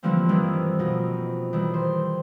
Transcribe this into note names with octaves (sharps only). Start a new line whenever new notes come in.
D3 E3 F3 G3 A#3 C4
G2 D#3 E3 G3
F2 B2 D#4
D#3 E3 G3
C5